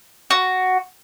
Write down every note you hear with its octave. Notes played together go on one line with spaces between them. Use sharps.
F#4